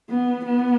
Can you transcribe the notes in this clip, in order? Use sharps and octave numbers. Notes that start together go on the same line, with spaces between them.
B3
B3